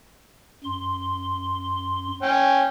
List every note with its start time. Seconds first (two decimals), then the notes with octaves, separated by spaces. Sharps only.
0.64 F#2 C6
2.22 C#4 G5